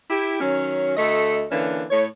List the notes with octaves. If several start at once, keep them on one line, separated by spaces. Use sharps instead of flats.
E4 G4
D#3 F#3 C#4
D2 A3 A4 D#5
D3 E3 A#3 C#4 D4
A2 C#5